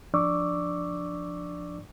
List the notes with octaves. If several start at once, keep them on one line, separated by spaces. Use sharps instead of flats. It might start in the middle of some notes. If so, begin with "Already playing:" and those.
F3 D4 D5 C#6 D6 E6